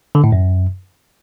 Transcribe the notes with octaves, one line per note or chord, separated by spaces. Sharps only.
D3
A2
F#2